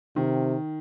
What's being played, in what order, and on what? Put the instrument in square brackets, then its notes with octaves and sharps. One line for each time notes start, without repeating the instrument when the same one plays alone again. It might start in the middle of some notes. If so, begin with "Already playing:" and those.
[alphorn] C3 [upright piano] D#3